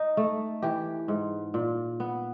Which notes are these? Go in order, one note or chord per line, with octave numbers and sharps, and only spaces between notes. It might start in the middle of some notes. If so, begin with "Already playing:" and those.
Already playing: D#4
A3
E3 G4
G#2
A#2
B3